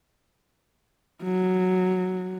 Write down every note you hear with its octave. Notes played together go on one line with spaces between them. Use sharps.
F#3